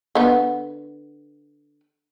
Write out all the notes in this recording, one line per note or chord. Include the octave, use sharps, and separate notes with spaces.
D3 B3